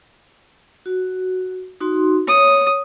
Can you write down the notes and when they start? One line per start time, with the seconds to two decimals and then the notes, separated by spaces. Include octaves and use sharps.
0.86 F#4
1.81 D#4 F#4 C6
2.27 C#5 D#6